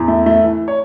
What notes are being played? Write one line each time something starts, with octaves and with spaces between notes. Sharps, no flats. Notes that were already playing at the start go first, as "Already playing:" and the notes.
Already playing: E2
A3
A3
E3
C#5